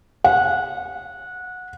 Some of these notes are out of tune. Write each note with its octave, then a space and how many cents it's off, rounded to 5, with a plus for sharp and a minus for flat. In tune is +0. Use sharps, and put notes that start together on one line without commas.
F#5 -20